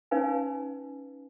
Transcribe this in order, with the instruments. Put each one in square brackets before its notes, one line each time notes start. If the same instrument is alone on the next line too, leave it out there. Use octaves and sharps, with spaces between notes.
[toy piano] C#4 D#4 B4 F5 G#5